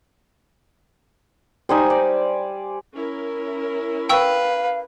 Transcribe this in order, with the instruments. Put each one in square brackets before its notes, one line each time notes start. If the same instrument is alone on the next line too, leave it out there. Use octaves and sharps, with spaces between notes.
[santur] G3 D#4 [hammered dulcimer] C5 G#5
[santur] D5
[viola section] C#4 E4 A#4
[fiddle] B4 [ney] F5 [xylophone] G5 C#6 E6